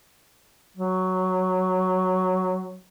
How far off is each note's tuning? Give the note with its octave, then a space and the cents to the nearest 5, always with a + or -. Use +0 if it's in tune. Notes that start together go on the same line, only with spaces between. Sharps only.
F#3 +0